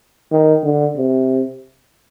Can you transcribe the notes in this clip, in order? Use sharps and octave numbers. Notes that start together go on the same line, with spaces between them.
D#3
D3
C3